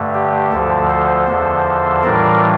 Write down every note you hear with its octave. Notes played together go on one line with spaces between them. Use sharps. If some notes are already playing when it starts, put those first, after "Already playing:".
Already playing: G2 D3 A3
G4
D2 D3 F3 A4
A4 C5
E2 D3 F3
A2 E3 G3 D4 F4 A#4 D5